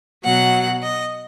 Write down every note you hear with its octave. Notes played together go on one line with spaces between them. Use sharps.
B2 F#3 F#5
D#5